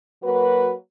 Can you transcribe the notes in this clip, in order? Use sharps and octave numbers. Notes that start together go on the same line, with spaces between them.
F#3 A#3 F#4 B4